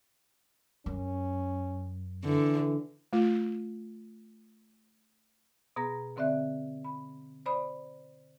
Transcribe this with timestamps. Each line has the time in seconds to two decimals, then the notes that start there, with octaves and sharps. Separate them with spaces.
0.86 F#2 C#4
2.25 D3 E3
3.13 A3 F4
5.76 B2 B3 G#4 A#5 A#6
6.16 B2 D3 C4 D5 E5 F#6
6.84 B5
7.46 C5 D5 B5 D#6